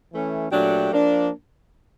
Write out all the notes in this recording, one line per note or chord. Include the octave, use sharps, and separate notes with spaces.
E3 A3 C#4
A#2 F#3 A3 D4 G4
F3 A#3 D4